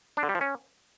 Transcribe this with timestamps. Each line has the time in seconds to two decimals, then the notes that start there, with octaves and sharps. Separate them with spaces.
0.17 D4
0.23 D3
0.29 G3
0.35 F3
0.41 C#4